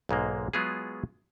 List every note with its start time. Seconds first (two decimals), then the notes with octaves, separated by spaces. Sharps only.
0.09 B1 G#2 G#3 A#3
0.53 F#3 G#3 B3 F4 G#4